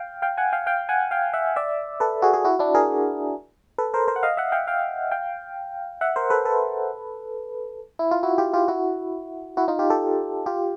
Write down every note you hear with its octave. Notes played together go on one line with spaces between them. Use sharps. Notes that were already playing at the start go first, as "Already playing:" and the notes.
Already playing: F5 G5
F5 G5
F#5 G#5
F5 G5
F5 G5
F#5 G#5
F5 G5
E5 F#5
D5 E5
A4 B4
F#4 G#4
F#4 G#4
E4 F#4
D4 E4
G#4 A#4
A4 B4
A#4 C5
A#4 C5
F#5
D#5 F5
E5 F#5
F5 G5
F5 G5
F5 G5
E5 F#5
A#4 C5
A4 B4
A4 B4
E4
F4
E4 F#4
F4 G4
F4 G4
E4 F#4
E4 F#4
D#4 F4
F4 G4
G4 A4
F4 G4